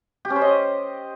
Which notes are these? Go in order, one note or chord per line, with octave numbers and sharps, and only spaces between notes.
G4
C#4
C5
D#5